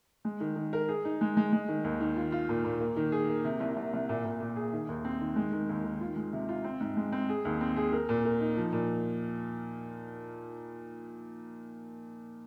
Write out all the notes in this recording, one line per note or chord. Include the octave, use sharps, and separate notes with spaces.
G#3
D#3
D#3
A#4
G#4
D#4
G#3
G#3
G#3
D#3
D#2
D#3
F4
F4
A#2
A#2
A#3
D#3
G#4
A#3
C3
C2
C2
C2
A#2
A#2
A#2
G#4
D#3
D#2
C4
D#3
G#3
D#3
D#2
D#3
F4
G#3
C3
F4
C4
G#2
G#3
C4
G#4
D#2
C4
G#4
A#4
A#2
A#4
D#4
F3
A#2